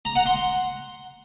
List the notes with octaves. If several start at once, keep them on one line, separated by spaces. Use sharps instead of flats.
A#5
F#5
C6